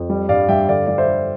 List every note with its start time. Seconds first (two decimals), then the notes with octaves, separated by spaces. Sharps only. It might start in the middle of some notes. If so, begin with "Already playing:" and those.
Already playing: F2
0.10 G3
0.29 G2 D5 F5
0.49 G2 E5 G5
0.68 D3 D5 F5
0.87 G3 D5
0.98 C5 E5
1.07 D3